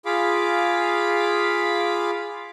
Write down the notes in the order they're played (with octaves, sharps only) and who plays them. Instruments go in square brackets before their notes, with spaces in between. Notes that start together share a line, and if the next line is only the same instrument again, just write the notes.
[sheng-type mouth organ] F4 G#4 F5 B5 D6